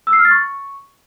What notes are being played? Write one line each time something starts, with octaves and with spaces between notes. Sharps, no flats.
E6
C7
F6
A6
C#6